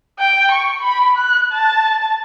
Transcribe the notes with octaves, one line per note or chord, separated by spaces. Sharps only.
G5
C#6
B5
F#6
A5